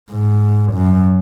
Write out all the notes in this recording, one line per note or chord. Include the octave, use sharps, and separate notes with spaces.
G#2
F#2